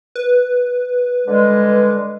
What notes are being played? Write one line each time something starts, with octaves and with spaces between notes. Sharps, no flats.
B4
D3 G3 G#3